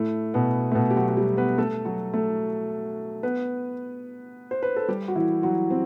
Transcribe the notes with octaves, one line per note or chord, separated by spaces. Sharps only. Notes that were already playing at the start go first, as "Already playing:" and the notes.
Already playing: A2 A3
B2 B3
A3
B2 B3
G4
F#3 F#4
F#4
G3 G4
B3 B4
A3 A4
F#3 F#4
A3 A4
B3 B4
C5
B4
A4
G3 G4
F#4
E3 E4
F#3 F#4
C4